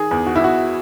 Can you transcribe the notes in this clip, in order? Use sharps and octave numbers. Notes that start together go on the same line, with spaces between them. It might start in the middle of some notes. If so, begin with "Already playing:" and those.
Already playing: D#3 G#4
E2
F#4
E4
E2 F#4